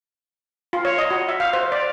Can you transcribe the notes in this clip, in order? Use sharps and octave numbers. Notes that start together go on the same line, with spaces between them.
F4
C#5
D#5
F#4
E5
F5
C5
D5